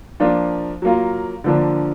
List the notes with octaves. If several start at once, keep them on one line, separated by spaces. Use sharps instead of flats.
F3 A#3 D4 F4
F#3 A#3 F4
D3 F3 A#3 D4